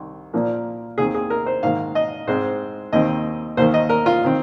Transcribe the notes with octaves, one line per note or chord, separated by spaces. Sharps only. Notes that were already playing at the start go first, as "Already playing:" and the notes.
Already playing: C2 D#3
A#2 F3 A#3
D#2 D#3 C4 G#4
G#4
A#4
C5
G#2 D#3 A#3 F5
D#5
G#2 G#3 C4 C5
D#2 D#3 C4 D#5
D#2 D#3 A#3 C5
D#5
A#4
F4
D#3 C4